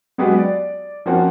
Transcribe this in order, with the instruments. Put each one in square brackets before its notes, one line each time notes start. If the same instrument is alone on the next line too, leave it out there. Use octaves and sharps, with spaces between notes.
[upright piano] F#3 G#3 B3 F#4 G4 B4
D5
F3 A#3 C4 C#4 F4 F#4